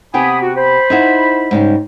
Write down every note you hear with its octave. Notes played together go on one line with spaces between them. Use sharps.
C3 B3 G4 G#5 B5 D#6
F#4
C5 B5
D#4 E4 F#4
G#2 C#3 G3